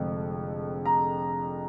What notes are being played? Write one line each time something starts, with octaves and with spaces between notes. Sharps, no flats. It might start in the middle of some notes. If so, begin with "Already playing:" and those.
Already playing: F1 F2 D3 G#3
A#5